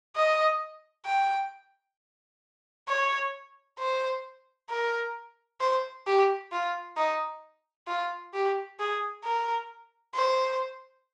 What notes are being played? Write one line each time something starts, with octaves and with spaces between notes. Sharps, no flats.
D#5
G5
C#5
C5
A#4
C5
G4
F4
D#4
F4
G4
G#4
A#4
C5